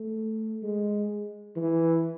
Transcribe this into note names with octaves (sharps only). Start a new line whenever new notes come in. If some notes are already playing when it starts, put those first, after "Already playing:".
Already playing: A3
G#3
E3